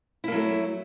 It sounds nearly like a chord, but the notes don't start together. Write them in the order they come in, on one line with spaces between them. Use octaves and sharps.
E4 A#3 F#3 A3